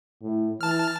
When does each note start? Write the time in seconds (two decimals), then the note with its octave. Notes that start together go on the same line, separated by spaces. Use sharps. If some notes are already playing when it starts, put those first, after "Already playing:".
0.22 A2
0.61 E3 A5 F6